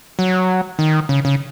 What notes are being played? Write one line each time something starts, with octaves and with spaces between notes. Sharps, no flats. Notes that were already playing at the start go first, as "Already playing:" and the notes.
F#3
D#3
C#3
C#3